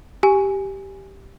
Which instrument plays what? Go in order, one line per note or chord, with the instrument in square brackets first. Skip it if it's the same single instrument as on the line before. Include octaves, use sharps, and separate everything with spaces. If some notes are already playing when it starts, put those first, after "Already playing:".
[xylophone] G4 G#5